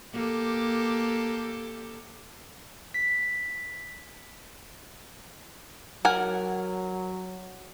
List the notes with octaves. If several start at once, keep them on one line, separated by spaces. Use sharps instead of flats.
A#3 G4 A4
B6
F#3 A#4 F#5 G#5